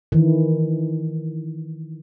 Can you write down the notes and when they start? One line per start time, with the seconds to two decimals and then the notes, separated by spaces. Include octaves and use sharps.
0.12 D#3 E3